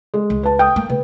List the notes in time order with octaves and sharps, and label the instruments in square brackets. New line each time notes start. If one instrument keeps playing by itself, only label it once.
[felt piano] G#3
[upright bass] C#2
[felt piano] B4 A5
G5 D#6
[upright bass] A#3
[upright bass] C#3 [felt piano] B4